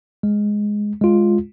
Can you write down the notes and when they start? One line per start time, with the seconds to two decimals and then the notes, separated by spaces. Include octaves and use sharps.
0.23 G#3
1.01 G#3 F4